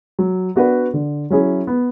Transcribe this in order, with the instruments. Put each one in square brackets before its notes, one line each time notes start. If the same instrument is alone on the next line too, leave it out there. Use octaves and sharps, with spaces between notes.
[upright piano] F#3
B3 D4 F#4 B4
D3
F#3 C#4 E4 G#4
B3